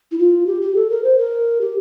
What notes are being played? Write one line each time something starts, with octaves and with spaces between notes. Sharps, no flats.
E4
F4
G4
G4
A4
A#4
C5
A#4
G4